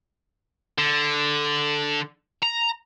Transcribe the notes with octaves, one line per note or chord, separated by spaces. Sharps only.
D3
A#5